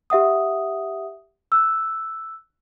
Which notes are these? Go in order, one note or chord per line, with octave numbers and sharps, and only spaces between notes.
G4 E5 F#5 D#6
E6 F#6